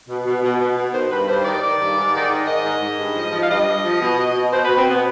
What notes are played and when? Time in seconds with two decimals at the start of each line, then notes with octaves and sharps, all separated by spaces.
0.09 B2
0.26 B2
0.43 B2
0.60 B2
0.78 B2
0.93 D#3 C5
1.11 G2 B4
1.28 G2 C5
1.45 D#3 D5
1.63 D#3
1.79 G2
1.97 G#2
2.14 D#3
2.31 G#2
2.47 D#3 D#5
2.64 G#2
2.81 G#2
2.98 G2
3.15 F3
3.32 F3
3.43 F5
3.50 G2 D#5
3.67 G2
3.84 F3
4.01 B2
4.18 B2
4.35 B2
4.52 B2 C5
4.65 B2 B4
4.77 C4
4.86 B2 B3